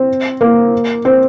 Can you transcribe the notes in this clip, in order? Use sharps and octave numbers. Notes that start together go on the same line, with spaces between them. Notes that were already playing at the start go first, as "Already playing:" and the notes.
Already playing: C4
A#3
C4